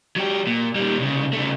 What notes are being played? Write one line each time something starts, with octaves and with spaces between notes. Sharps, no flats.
F#3 G4
A#2
A#2 G3
C2 C#3
C#3 A3